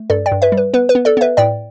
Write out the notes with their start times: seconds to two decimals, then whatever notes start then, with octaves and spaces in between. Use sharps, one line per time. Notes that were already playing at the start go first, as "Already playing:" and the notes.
Already playing: A3
0.10 G2 A4 D5
0.26 D5 G5
0.32 G2
0.42 B4 E5
0.52 G3
0.57 B4
0.74 B3 B4
0.89 B4
0.95 B3
1.05 A4 D5
1.17 B3 B4 E5
1.37 A2 D5 G5